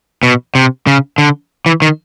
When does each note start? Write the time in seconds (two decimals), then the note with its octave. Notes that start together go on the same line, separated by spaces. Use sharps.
0.23 B2
0.55 C3
0.87 C#3
1.18 D3
1.66 E3
1.82 D#3